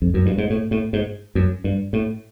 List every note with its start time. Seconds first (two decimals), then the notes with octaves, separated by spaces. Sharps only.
0.02 F2
0.14 F#2
0.26 G2
0.38 G#2
0.50 A2
0.71 A2
0.93 G#2
1.35 F#2
1.64 G2
1.93 A2